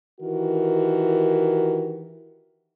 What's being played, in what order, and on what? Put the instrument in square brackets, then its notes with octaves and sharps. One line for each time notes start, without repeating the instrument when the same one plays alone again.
[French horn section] D#3 E3 F#4 G4 A#4